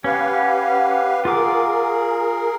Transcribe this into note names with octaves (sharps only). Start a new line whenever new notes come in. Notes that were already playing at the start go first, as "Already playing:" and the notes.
C#4 G4 B4 F5 F#5
F4 G#4 A#4 F5 D6